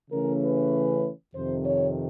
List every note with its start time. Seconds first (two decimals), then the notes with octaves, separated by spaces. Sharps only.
0.10 C#3 E3 A3 C#4 A#4
0.42 B4
1.34 F2 C3 D#3 C5
1.65 C#5